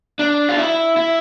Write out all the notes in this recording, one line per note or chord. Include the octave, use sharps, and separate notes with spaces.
D4
F4
E4
E4